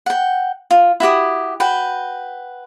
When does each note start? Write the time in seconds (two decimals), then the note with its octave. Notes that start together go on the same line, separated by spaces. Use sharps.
0.06 F#5 G5
0.71 F4
1.00 E4 F#4 G4 D#6
1.60 F#4 B4 G5